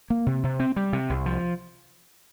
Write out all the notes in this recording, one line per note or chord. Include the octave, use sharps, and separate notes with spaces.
A#3
C3
C3
C4
G3
C3
C2
F3